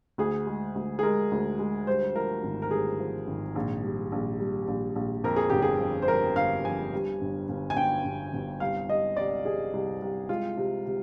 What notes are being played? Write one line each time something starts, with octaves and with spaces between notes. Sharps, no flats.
D2 G#4
G#3
D2
G#4
G#3 A#4
D2
G#3
G2 C5
F3 A#4
G#1
A#4
G2 G#4
F3
G#1
A#1
G3
A#1
G3
A#1
A#1
F2 A#4
G#4
G1 G4
G#4
F2
C5
F2 A#4
G1 F5
F2 G#5
G2
G1
G1
G#5
G1 G5
G1
G1
C2 F5
C2 D#5
C2 D5
C3 G#4
C2
C2
G#3 F4
C3
C3